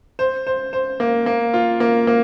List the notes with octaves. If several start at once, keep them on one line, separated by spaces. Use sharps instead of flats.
C5
C5
C5
A#3
A#3
F4
A#3
A#3